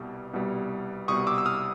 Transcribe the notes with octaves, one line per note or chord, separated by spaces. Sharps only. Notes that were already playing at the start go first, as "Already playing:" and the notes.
Already playing: C2 B2 G3
C2 B2 G3
C2 B2 G3 C#6 D#6
D6 E6
E6
D#6 F6